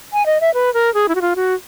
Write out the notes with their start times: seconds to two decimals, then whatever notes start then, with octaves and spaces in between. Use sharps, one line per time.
0.13 G#5
0.26 D#5
0.41 E5
0.54 B4
0.74 A#4
0.94 G#4
1.09 E4
1.15 F#4
1.22 F4
1.36 F#4